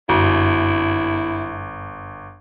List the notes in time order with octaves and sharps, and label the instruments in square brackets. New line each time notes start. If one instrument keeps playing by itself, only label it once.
[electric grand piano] G1 [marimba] F#2 [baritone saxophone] E4